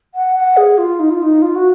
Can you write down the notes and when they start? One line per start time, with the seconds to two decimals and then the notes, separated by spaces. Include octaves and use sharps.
0.14 F#5
0.36 F#5
0.57 G#4
0.78 F4
0.99 D#4
1.10 F4
1.23 D#4
1.42 F4
1.55 F#4